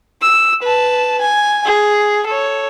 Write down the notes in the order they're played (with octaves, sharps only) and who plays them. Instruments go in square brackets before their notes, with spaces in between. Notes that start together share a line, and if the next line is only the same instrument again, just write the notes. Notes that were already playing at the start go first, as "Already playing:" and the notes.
[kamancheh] E6
B4 A5
G#5
G#4
A4 C#5